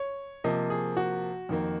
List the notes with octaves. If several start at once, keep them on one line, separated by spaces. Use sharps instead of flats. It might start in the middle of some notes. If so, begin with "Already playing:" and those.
Already playing: C#5
C3 F3 A#3 D#5
G#4
F#4
F2 D#3 A#3